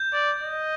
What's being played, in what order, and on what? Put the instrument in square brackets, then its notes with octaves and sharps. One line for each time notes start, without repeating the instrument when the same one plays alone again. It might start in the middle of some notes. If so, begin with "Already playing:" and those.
Already playing: [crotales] G6
[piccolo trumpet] D5
D#5